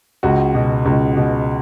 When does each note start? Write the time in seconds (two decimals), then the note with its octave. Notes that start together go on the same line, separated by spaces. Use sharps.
0.23 C#2 F#4
0.55 B2
0.86 C#2
1.17 B2